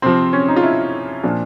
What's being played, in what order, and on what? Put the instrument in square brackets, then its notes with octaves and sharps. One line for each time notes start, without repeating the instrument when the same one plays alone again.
[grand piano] C3 F3 C4
C#4
D#4
F4
E4
A#2 F3 D4